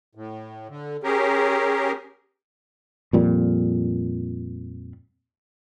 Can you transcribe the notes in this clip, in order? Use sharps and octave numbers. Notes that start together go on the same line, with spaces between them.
A2
D3
C#4 G4 G#4 A#4
F2 A#2 G3